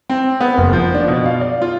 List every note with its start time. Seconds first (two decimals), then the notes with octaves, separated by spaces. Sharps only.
0.10 C4
0.41 B3
0.58 F#1
0.73 F3
0.95 D4
1.08 B2
1.26 F5
1.41 D5
1.62 F4